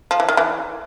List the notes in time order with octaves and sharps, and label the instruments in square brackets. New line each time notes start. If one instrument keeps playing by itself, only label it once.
[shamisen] F3
E3
D#3
E3